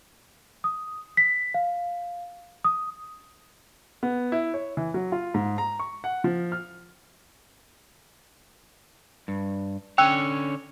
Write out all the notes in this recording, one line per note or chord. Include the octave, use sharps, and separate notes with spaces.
D#6
B6
F5
D#6
B3
E4
C#5
E3
F#3
F4
G#2
A#5
C#6
F#5
F3
F6
G2
D3 C#4 C#5 G5 E6 F#6